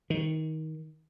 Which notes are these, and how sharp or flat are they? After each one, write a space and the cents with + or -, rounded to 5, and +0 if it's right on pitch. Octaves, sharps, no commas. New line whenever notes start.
D#3 +20